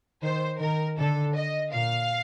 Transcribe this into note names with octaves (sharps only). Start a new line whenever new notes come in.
D#3 C5
D#3 A#4
D3 A4
D#5
A#2 F5